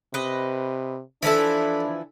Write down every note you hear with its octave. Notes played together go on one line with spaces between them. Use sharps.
C3 B4 D#5
E3 F3 D4 E4 A4 B5